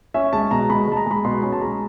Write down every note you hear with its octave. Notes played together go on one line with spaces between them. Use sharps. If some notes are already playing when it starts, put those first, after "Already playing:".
C#4 E5
G#3 A5
B2 A#5
G#3 B5
G#3 A5
A#5
G#3 B5
B2 C6
C#4 B5
A5
G#3 A#5